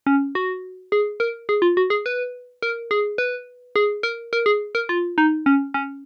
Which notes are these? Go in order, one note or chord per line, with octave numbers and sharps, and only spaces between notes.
C#4
F#4
G#4
A#4
G#4
F4
F#4
G#4
B4
A#4
G#4
B4
G#4
A#4
A#4
G#4
A#4
F4
D#4
C#4
C#4